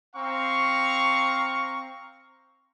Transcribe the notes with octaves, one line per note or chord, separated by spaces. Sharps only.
C4 F5 A#5 C#6